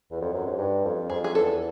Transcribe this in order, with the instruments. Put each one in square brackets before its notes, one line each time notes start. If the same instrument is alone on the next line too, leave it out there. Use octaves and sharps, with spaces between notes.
[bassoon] E2
F2
F#2
G#2
G2
F2
[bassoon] F2 [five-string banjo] G#4
[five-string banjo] G#4
[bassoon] E2 [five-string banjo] A4